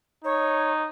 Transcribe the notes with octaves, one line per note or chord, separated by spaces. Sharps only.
D#4 C#5